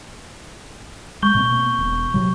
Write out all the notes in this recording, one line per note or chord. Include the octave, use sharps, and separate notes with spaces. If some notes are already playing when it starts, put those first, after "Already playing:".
G#3 C#6 G6 G7
B2 A#3 C4
E1
C3 F#3